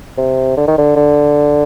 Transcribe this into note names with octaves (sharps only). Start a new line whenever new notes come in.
C3
D3
D#3
D3
D3